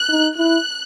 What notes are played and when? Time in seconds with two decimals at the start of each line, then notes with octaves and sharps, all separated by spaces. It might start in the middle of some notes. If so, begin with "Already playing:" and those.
Already playing: F#6
0.09 D#4
0.37 E4 F#6